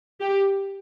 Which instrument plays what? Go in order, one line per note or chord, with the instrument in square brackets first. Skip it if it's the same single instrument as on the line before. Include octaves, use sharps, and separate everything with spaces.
[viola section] G4